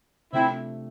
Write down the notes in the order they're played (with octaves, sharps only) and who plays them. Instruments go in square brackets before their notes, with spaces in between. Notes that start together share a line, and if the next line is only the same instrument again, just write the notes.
[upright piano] C3 F3 A3 D4 [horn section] C4 E4